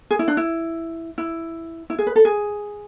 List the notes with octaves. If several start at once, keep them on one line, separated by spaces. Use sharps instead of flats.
G#4
E4
D4
E4
E4
E4
G#4
B4
A4
G#4